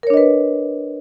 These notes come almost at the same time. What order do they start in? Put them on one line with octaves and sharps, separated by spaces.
A#4 C#5 D4 D#5 B4